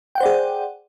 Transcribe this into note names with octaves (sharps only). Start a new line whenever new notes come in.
G#4 C5 D5 F#5 G5